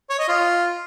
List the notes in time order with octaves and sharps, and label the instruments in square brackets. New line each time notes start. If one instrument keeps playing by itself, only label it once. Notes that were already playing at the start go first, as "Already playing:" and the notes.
[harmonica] C#5
D#5
F4